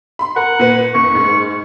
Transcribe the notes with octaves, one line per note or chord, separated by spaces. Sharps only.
B5 C6
A#4 F#5
A#2 B4
F#1 C#6
G#2